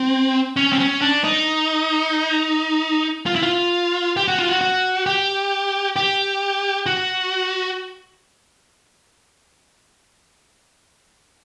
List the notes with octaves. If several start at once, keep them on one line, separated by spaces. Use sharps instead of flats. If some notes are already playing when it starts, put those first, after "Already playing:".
Already playing: C4
C#4
C4
C#4
D4
D#4
F4
E4
F4
G4
F#4
F4
F#4
F#4
G4
G4
F#4